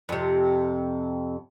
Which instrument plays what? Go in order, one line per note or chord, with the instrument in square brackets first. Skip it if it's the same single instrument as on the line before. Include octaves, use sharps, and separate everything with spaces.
[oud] F2 C3